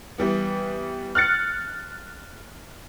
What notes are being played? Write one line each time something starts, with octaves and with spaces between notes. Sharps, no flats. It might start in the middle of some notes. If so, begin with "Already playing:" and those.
E3 G3 B3
F6 F#6 A6 C#7